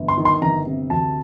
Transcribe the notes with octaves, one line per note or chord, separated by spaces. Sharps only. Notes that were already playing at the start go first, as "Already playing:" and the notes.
Already playing: G1
C6
D#3
C6
G1 A#5
C3
D2 A5